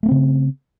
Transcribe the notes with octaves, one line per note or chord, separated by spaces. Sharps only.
C#3 A3 A#3 C4